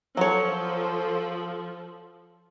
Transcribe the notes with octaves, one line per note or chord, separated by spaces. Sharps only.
F3 F#3 A4 C#5